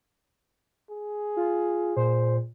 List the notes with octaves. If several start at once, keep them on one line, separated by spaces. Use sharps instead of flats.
G#4
F4
A#2 C5